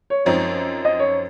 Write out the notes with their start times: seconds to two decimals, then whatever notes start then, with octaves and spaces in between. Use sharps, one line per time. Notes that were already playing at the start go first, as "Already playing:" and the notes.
0.10 C#5
0.25 F#2 F3 C4 D#4 C#5
0.85 D#5
0.99 C#5